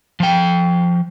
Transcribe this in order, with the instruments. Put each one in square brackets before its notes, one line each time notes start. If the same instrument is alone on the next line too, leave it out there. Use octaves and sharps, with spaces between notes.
[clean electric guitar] F3 G5